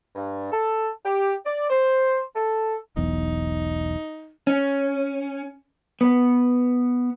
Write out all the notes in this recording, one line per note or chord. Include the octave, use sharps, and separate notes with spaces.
G2
A4
G4
D5
C5
A4
E1 B1 E2 D#4
C#4
B3